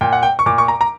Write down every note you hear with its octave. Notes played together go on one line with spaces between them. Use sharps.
A#2 G5
F#5
G5
C#6
A#2 D6
C#6
A#5
A#5